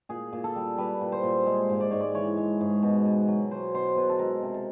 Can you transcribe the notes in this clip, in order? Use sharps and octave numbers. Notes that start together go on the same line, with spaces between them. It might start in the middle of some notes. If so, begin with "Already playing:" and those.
A#2 G#4
A#2
A4
G3
G3 B4
A#2
C5
A#2
G#3
G#2
D5
G#2 C#5
D5
E3 C#5
G#3
G#2
B2
B2
F#3
F#3 C5
B2 C5
B2 B4
A4
G#3 A#4
C3
A4